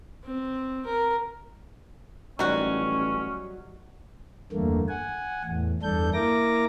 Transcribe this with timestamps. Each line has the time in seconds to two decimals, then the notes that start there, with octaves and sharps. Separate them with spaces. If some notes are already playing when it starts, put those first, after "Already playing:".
0.24 C4
0.86 A#4
2.39 A1 D#3 F#3 G3 C#4 F#4
4.52 E2 G2 D3 A3 A#3
4.89 F#5 G#5
5.45 E2 A2
5.82 E2 G2 D4 A4 G6
6.14 A#3 E4 A#4 D6 A#6